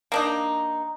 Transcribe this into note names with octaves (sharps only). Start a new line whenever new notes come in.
A#3 D4 D#4